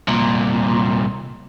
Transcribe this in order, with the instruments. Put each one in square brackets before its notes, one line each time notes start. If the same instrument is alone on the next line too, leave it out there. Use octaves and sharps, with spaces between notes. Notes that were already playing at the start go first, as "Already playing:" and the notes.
[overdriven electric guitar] C2 A#2